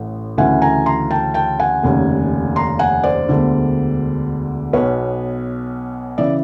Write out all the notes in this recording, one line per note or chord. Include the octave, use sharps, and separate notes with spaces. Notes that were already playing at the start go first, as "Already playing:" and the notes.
Already playing: A1 A2
D2 C#3 E3 F#5 G#5
G#5 A#5
A#5 C6
G5 A5
G5 A5
F#5 G#5
F1 D#2 C#3
A#5 C6
F#5 G#5
C5 D5
E1 D2 D3
B1 B2 B4 C#5
C#3 E3 D5 E5